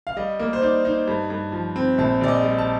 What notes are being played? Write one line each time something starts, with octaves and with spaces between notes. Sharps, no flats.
F5
G3 D#5
A#3
C5
D#4 D5
D#4
G2
G2
F3
C4
A#1 A5
A#1 D5
D#5
G3
A5